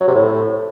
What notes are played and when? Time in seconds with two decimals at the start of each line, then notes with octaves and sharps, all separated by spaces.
0.01 F#3
0.08 C3
0.15 A2